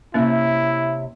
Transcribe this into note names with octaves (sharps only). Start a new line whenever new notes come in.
C3 A#3 C#4 E4 C#5 E5